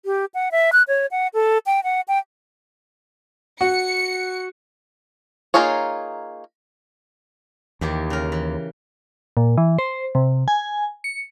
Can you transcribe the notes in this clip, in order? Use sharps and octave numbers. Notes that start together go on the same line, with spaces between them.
G4
F#5
E5
F#6
C#5
F#5
A4
G5
F#5
G5
F#4 C#7
A#3 D#4 F4 G#4 C#5
D#2 D#3 E3 G4
C#3 A#4
E3
A#2
E3
C5
C3
G#5
C#7